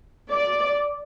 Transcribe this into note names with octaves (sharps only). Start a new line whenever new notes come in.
D5